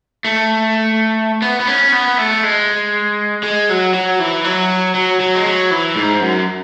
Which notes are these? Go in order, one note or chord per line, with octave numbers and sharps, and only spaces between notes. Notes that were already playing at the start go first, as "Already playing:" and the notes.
A3
B3
B3
C#4
B3
A3
G#3
G#3
F#3
F#3
E3
F#3
F#3
F#3
G#3
F#3
E3
G#2
F#2